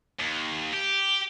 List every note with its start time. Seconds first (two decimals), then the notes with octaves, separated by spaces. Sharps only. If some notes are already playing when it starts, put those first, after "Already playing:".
0.19 D#2
0.73 G4